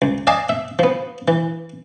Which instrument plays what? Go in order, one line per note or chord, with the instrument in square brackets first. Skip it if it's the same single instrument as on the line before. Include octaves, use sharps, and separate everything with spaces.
[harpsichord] C#2
D5 D#5 F5 G#5 A5
E5
F3 B3
E3